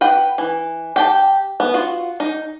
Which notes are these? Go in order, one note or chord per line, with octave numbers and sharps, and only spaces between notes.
B4 F#5 G5
E3
G4 G5 A5
B3
F4 F#4
D#4